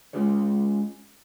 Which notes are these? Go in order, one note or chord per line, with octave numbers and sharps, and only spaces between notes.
G#3 C#4 F4 G#4 C#5